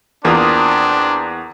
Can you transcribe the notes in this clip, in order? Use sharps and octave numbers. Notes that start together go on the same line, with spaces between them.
E2 A#3 C4 D4 F4 D#6